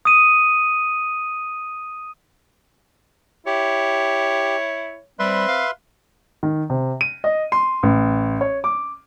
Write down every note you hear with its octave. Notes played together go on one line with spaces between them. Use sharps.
D#6 D#7
E4 G4 C#5
G3 C4 B4 E5 C6
F5
D#3
C3
D#7
D#5
C6
A1
C#5
D6